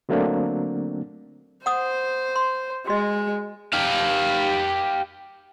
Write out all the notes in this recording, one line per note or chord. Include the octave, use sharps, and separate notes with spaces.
D3 F#3 A3 A#3 C4 D4
C5 F#5 D#6
C6
G#3 F#4 D#5
G4 F5